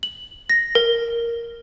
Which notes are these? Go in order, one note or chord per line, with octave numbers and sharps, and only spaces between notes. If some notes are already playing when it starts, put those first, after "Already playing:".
F#7
A#6
A#4